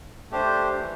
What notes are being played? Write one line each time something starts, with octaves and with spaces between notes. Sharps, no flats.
A3 D4 G4 C5
E3